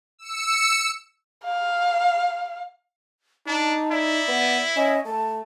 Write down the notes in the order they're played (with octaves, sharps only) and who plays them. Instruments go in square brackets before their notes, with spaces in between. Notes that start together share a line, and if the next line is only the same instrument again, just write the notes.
[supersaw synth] E6 C#7
[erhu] F5
[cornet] D4 [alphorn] D#4 [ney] A5
[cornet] E4 [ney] D5
[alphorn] B3
[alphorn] C#4 [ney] D#5
[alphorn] A3 [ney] A5